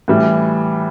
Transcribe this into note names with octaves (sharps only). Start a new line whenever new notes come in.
A2 E3 G3